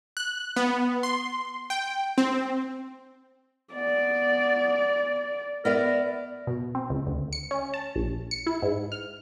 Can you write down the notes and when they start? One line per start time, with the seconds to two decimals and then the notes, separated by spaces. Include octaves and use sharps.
0.17 F#6
0.56 B3
1.03 C6
1.70 G5
2.18 C4
3.74 B3 D5
5.65 B3 A#4 D5 E5
6.47 B2
6.75 C4
6.90 C#2
7.07 D2
7.33 C#7
7.51 C#4
7.74 A5
7.96 A#1
8.31 C#7
8.47 E4
8.62 G#2
8.92 F6